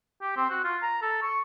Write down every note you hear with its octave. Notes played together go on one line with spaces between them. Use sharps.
G4
C4
F#4
F4
A#5
A4
C#6